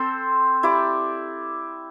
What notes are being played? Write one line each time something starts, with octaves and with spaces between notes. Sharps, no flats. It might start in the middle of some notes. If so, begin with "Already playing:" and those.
Already playing: C4 A4 C5
E4 G4 D5